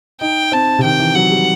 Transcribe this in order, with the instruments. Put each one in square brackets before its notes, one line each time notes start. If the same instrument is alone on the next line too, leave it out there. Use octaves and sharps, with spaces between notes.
[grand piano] D#4 [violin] G5
[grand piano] C4 [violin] A5
[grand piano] C3
[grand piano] D#3 [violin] G5
[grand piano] E3
[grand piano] F#3 [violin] F#5
[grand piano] G3